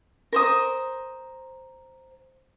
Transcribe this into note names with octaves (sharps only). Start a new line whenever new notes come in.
A#4 C5 D#6